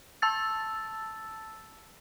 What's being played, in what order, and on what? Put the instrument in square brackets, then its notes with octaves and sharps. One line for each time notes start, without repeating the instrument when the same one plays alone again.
[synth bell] A5 E6 A6